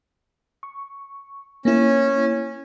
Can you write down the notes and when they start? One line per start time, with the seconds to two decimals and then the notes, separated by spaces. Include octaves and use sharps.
0.63 C#6
1.65 A#3 C#4 E4